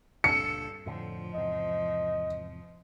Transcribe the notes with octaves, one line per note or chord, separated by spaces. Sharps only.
C#2 G2 A#2 D4 A4 C#7
F2 A2 D3 F3
E2 G#2 C3 D#5